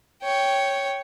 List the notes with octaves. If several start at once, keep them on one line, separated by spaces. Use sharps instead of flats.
C#5 G5